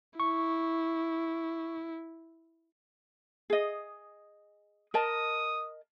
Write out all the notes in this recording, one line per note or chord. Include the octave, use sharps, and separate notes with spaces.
E4 C#6
G#4 D#5
A#4 D#5 A5 D#6